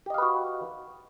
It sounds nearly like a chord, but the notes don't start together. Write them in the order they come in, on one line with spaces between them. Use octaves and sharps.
G4 D#5 F5 B4 F#4